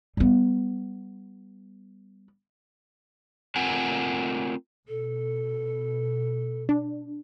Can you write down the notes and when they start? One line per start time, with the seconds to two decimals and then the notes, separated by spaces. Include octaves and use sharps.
0.17 G3 B3
3.56 A3 C4 F4 A#4 F#5 G#5
4.88 B2 A4
6.69 D4